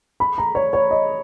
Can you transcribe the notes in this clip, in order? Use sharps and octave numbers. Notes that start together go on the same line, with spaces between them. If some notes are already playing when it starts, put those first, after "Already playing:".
B5
A#5
C#5
C#5
D#5